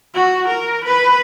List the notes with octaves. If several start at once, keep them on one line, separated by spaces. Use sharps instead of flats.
F#4
A#4
B4